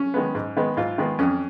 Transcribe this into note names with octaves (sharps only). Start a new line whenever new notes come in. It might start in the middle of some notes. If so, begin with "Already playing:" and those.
Already playing: C#4
D#3 G#3 B3
G#2
D#3 G#3 B3
G#2 F4
D#3 G#3 B3
F2 C#4